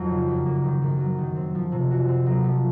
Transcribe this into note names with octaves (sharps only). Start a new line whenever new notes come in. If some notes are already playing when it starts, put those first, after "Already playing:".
Already playing: F2 F#3 A#3 D#4
C#3
F#2
A#3
D#3
F#2
F#3
D#3
C4
F3
C3
F#4
C4
F#3
F3